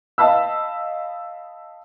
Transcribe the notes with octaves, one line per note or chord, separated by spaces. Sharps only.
D#5 F5 A5 B5 E6